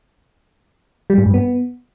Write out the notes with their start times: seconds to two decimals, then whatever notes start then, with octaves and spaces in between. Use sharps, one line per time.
1.10 G3
1.18 G#2
1.26 G2
1.34 B3